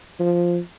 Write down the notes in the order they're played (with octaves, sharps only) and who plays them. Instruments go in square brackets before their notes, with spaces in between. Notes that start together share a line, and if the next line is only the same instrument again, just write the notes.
[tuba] F3